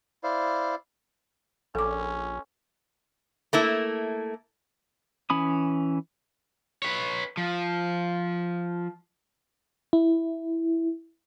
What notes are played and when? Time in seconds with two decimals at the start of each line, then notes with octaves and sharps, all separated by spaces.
0.24 E4 C5 D5 F5
1.75 A#1 C#4 A4 D6
3.53 A3 A#3 E4
5.30 E3 C#4 B5 D#6
6.82 B4 C#5
7.37 F3
9.93 E4